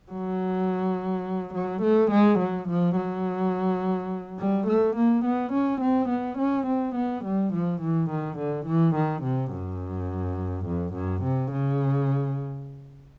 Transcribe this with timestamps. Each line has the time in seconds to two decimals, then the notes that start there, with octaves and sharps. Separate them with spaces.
0.12 F#3
1.54 F#3
1.82 A3
2.11 G#3
2.40 F#3
2.69 F3
2.97 F#3
4.39 G3
4.67 A3
4.96 A#3
5.25 B3
5.53 C#4
5.81 C4
6.10 B3
6.38 C#4
6.67 C4
6.96 B3
7.24 G3
7.53 F3
7.81 E3
8.10 D#3
8.38 D3
8.66 E3
8.95 D#3
9.23 C3
9.52 F#2
10.66 F2
10.94 F#2
11.23 C3
11.52 C#3